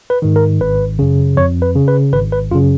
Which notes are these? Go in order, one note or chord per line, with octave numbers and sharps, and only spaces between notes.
B4
G#2 D#3
A#4
G#1 B4
F#2 C#3
F2 C#5
B4
C#3
B4
G#1 B4
B4
F#2 C#3 F4